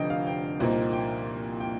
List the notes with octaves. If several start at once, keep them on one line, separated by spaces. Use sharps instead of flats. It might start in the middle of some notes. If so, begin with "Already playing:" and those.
Already playing: F1 F2 D3 G3 C4 D#5 G5
F5
G5
C2 A#2 F3 A#3 D#4
G5
G5